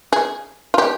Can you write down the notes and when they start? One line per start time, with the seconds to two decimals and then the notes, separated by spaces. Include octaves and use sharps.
0.13 G#4
0.74 F4
0.78 G4